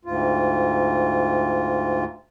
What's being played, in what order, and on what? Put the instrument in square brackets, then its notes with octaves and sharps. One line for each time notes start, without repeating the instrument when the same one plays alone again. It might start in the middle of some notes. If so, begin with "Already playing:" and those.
[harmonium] D2 G#2 F4